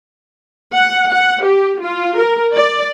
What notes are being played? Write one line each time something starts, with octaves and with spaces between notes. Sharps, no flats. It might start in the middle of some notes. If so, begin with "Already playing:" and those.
F#5
F#5
G4
F4
A#4
D5